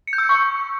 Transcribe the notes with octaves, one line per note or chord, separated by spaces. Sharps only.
C#7
G6
E6
C#7
C#6